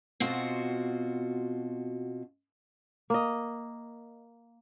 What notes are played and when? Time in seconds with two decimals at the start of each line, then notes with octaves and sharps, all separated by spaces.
0.20 B2 C4 F4 F#4
3.10 A#3 D#5